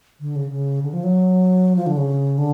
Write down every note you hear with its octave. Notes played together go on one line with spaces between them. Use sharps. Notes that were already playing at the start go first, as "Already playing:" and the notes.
D3
C#3
C#3
D3
F3
F#3
F3
D3
C#3
D3